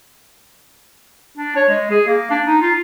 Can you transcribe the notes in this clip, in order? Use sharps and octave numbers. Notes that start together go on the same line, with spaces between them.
D4
C#5
G#3
G#4
A#3
D4
D#4
F4